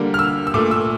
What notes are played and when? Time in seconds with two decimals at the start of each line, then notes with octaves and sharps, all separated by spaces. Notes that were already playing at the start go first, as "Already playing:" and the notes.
Already playing: D3 G3 A#3
0.14 F6
0.19 E6
0.47 E6
0.54 A#2 A3 D6
0.71 E6